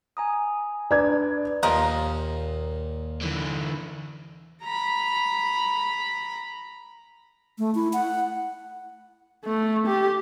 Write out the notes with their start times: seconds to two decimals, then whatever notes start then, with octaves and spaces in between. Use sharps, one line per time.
0.17 G#5 A#5 D#6
0.91 D4 B4 D5 A#5 G#6
1.63 D#2 A#2 F3 A#4 D#5
3.21 D3 E3
4.63 A#5 B5
7.59 A3
7.75 E4
7.93 F#5
9.45 A3
9.87 G4